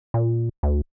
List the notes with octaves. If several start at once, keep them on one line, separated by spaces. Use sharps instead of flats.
A#2
D2